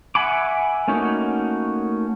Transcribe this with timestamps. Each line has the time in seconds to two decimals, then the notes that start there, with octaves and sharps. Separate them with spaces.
0.15 E5 F#5 G#5 B5 D6
0.88 A3 A#3 C#4 D#4 F#4